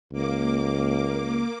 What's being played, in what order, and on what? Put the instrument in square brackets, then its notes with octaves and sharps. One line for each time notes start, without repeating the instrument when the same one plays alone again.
[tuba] C#2 [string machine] A#3 D6